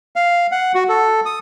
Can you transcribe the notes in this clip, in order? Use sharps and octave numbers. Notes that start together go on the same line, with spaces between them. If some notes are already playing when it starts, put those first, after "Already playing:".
F5
F#5
F#4
A4
D#6